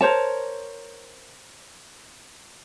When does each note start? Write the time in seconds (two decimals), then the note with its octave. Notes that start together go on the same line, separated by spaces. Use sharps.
0.01 A#4 C5 C#5 A5